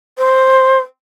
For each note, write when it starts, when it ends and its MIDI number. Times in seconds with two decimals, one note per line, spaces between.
0.18 0.79 72